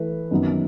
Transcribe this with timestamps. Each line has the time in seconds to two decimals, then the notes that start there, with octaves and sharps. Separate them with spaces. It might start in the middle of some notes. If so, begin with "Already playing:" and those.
Already playing: E3 A3 B4
0.31 F#2 D#3 F#3 B3